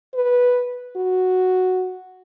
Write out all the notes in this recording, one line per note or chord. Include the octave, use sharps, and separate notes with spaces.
B4
F#4